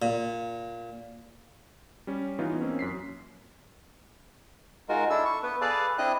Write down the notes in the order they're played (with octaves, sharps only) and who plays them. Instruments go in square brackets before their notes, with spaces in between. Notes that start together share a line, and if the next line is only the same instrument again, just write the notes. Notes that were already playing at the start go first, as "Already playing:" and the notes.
[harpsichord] A#2
[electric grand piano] G3 C#4
E3 B3 D#4 F4
A#3 C4 C#4
F#2 B6 C7
[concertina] G#3 D#4 F4 F#4 A#4
D4 E4 A4 E6
C#6
B3 B4
G#4 A4 B4 D5 F5 A5
C4 D4 E4 D#5 F#6